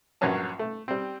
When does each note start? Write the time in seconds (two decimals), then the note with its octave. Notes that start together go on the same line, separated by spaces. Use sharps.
0.21 A#1 G2 F#3 C#4 A5
0.59 A3
0.88 G3 C4